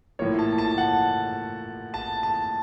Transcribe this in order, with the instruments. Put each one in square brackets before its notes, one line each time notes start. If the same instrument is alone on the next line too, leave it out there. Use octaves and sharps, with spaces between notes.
[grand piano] A2 F3 A#3 C#5
A5
A5
F#5
A5
A5